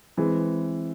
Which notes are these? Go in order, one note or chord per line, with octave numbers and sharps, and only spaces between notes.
E3 G#3 C4